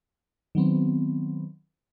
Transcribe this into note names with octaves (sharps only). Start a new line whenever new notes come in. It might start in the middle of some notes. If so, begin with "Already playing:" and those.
D#3 F#3 B3 C4